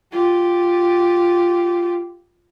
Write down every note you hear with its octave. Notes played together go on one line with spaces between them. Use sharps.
F4 G4